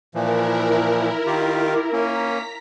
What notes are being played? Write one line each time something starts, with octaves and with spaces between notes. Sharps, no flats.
A#2 E3 F3 E4 A#4
D#3 F4 G4
A#3 C#4 A#5 B6